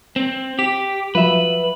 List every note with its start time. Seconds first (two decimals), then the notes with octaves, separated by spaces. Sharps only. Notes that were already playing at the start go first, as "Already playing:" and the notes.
0.16 C4
0.59 G4 B6
1.15 F3 F#3 B4 E5